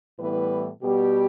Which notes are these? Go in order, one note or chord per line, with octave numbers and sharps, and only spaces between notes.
A2 E3 G3 B3 B4
B2 G3 B3 G4